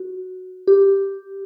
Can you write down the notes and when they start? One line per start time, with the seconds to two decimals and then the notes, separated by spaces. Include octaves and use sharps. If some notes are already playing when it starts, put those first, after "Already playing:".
Already playing: F#4
0.67 G4